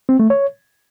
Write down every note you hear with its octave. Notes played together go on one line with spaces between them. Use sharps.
C4
A3
C#5